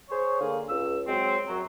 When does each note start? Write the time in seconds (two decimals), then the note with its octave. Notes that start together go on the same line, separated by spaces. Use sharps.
0.10 G#4 C5 C#5
0.40 D3 A#3 G#4 F5
0.69 C#2 E6
1.08 F#3 G#3 C4
1.48 F#2 F#3